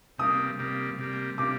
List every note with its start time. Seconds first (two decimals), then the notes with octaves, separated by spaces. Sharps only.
0.18 C3 G3 A#3 D#6
0.59 C3 G3 A#3
0.99 C3 G3 A#3
1.38 C3 G3 A#3 D6